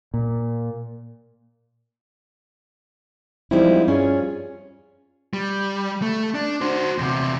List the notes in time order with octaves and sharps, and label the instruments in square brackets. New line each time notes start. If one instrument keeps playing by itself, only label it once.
[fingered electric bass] A#2
[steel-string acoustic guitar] F3 G3 G#3 C4 D#4 E4
G2 C#4 F4 G#4
[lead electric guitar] G3
A3
D4
F#4 C5
E2 C3